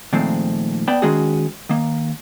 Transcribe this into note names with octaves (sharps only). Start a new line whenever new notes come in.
A#2 D#3 F3 G#3 A3 C4
B3 D5 G5 A5 B5
D#3 G#3 C#4 F#4 G#4
D#3 A#3